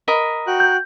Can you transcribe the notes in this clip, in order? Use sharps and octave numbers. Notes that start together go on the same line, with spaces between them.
A#4 D#5 B5
F#4 G5 F#6
G6